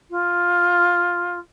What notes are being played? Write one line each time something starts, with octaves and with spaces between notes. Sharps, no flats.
F4